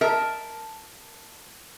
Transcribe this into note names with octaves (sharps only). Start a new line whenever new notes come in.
A#4 E5 A5